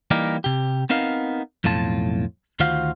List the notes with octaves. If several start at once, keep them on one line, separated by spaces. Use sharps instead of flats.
E3 G3 A#3 D#4 G4 A#4
C3 G4
B3 C4 D#4 A#4 F5
B1 F2 A2 F4 A5
D2 D#3 F4 F#4 C5 F5